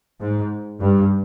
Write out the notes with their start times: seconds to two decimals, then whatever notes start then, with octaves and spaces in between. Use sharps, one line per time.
0.20 G#2
0.81 G2